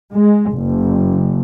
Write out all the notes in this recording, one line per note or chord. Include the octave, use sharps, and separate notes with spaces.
G#3
F#1